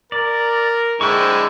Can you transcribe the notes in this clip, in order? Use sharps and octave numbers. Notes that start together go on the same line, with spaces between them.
A#4 D5
D3 G#3 E4 C5 G5 C#6